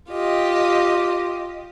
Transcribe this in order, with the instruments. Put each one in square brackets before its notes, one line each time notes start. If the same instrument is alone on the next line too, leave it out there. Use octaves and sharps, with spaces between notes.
[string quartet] F4 G4 D#5